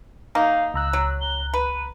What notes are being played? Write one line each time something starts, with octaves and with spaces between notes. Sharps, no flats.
A#3 D#4 F5
C#2 A#5 E6 F#6
F#3
G7
B4 D#7